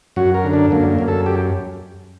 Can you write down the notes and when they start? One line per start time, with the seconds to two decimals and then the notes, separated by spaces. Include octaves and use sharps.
0.16 F#2 F#4
0.34 A#4
0.44 D3
0.53 D4
0.71 F#2 A#3
0.90 A#3
0.99 F#2
1.08 A4
1.26 G4